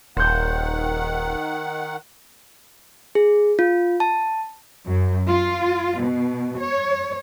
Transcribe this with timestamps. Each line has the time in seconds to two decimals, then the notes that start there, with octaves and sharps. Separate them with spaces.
0.17 D#1 D#3 C5 F#5 G6
3.15 G#4
3.59 F4
4.00 A5
4.87 F#2
5.28 F4
6.02 B2
6.60 C#5